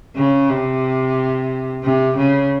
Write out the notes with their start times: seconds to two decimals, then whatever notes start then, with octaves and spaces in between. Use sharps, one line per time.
0.16 C#3
0.49 C3
1.83 C3
2.16 C#3